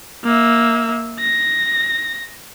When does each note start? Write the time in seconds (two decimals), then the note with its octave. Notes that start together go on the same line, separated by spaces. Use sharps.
0.24 A#3 E5
1.20 A#6